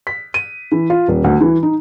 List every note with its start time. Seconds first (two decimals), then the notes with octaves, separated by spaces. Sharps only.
0.07 B6
0.34 D#7
0.72 E3
0.90 F4
1.08 D#1
1.24 D2
1.41 E3
1.63 D#4